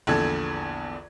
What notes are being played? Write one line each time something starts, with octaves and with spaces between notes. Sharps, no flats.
A#1 E2 D3 A4 G#6